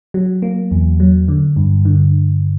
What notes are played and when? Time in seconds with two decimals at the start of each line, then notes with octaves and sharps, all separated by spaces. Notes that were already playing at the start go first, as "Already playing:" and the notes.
0.14 F#3
0.42 A#3
0.71 E2
1.00 F#3
1.28 D3
1.56 G2
1.85 D3